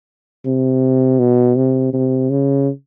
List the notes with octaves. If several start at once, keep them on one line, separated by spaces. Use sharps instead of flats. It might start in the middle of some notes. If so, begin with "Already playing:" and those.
C3
B2
C3
C3
C#3